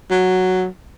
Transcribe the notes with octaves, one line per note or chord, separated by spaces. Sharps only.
F#3